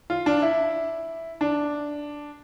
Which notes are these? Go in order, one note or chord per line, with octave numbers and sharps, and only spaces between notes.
F4
D4
E4
D4